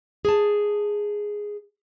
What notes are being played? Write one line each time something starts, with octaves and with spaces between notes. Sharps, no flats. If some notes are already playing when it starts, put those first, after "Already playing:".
G#4 A5